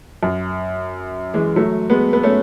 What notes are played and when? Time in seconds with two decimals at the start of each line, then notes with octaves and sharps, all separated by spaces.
0.23 F#2
1.34 E3 G#3
1.56 F#3 A3
1.90 G#3 B3
2.13 B3
2.23 A3 C#4